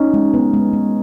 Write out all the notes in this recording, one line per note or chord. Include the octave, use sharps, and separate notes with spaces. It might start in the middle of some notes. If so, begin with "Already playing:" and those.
Already playing: C#4 D#4
G#3
B3
G#3
G#3